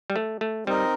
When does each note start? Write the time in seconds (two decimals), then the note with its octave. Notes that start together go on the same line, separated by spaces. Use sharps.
0.10 G3
0.16 A3
0.41 A3
0.67 G3 C4 D#4 A#4 D#5